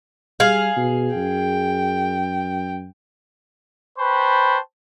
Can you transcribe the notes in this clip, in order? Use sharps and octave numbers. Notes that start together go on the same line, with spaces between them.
G3 G#4 F5
B2
F#2 G5
B4 C5 G5 A5 B5 C#6